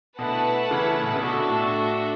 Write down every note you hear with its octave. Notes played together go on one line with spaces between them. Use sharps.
B2 D3 A3 E4 B4 F#5 A5
C#3 E3
A2
B2
C#3
B2 D3 D4 F#4 A4 E5
A2